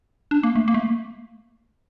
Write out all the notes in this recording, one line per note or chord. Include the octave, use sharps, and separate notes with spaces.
D4
A#3
A3
A#3
A3
A#3